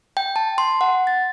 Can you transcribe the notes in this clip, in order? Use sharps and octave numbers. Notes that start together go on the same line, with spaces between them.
G5
A5
C6
F#5
A6